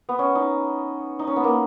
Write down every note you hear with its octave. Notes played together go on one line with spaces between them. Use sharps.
B3
C#4
D#4
D#4
C#4
B3
A#3